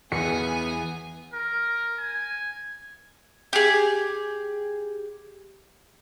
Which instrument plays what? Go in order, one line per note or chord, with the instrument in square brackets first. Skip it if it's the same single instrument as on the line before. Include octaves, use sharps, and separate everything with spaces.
[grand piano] E2 E3 E4 [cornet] B3 [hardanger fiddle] G#4 G#5 [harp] C#7
[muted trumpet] A#4
G#5
[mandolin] G4 G#4